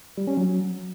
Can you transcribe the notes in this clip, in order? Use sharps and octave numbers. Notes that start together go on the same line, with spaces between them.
G3
C#4
F#3